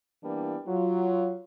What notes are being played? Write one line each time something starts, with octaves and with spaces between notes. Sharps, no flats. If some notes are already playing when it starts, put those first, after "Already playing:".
E3 G3 A#3 B3 D4 E4
F#3 F4